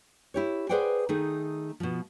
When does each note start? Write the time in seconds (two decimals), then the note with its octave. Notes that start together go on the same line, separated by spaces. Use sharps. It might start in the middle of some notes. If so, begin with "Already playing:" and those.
0.34 E4 G4 C#5
0.69 G#4 B4 C5 D5 F#5 G5
1.09 D#3 A3 D#4 G#4
1.80 B2 F3